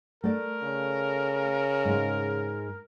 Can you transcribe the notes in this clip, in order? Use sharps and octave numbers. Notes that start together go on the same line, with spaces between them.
A3 A#4 D5
C#3
G#2 G#3